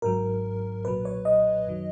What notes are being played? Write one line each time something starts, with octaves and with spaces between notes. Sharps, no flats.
G#1 G#2 F#3 A#4
B1 A#2 F#3 B4
C#5
D#5
F#2 D#3 F#3